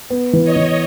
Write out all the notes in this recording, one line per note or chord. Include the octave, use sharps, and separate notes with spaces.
B3
E3
C#5 D#5
E3